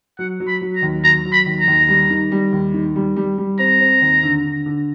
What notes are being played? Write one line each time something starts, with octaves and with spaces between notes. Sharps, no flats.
F#3 F#5
F#3
B5
F#3
A#5
D#2
F#3 A#5
F#3
B5
D#2
A#5
D#2
G3
D#3
G3
D#2
D#3
G3
G3
G3
C4 A#5
C4
D#2
D3
D3
D3